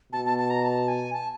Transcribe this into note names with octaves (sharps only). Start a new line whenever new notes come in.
B2 A5
A5
A5
A#5
A5
G#5
A5